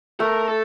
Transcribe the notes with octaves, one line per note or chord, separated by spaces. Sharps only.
A3 A#4
A4